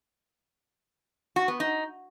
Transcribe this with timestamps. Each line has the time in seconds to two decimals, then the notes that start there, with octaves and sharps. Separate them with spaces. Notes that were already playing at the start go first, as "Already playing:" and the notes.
1.36 F#4
1.48 B3
1.60 D#4